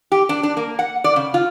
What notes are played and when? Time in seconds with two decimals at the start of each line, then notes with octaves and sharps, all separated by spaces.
0.12 G4
0.29 D4
0.43 D4
0.57 A#3
0.79 F#5
1.04 D5
1.16 C#3
1.34 F4